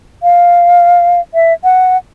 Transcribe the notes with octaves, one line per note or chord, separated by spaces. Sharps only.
F5
E5
F#5